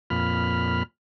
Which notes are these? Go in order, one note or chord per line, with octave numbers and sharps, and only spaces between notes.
F2 A#2 B5 F6